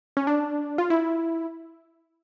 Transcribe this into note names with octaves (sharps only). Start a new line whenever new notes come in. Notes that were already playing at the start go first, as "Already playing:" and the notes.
C#4
D4
F4
E4